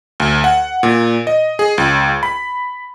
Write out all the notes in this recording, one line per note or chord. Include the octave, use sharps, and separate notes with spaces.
D2
F#5
A#2
D#5
G#4
C#2
B5